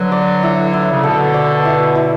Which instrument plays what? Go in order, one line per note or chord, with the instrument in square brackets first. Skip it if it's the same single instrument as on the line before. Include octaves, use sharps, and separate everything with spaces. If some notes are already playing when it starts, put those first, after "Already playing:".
Already playing: [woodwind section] D3 F#3 [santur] B4
[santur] D5
E4
E4
[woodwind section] C#3
[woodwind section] B2 D3 [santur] A4
[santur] D5
E4
E4